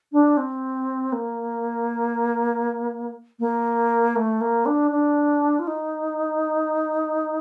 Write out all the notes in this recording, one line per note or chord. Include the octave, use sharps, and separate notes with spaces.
D4
C4
A#3
A#3
A3
A#3
D4
D4
F4
D#4